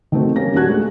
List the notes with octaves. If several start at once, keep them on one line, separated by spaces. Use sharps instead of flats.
D#3 A3 C4 F#4
G3 A#3 C#4 A#4 A#6
D#2 A#2 D4 F#4 F#6 G#6
G#3 A3 G4 G#4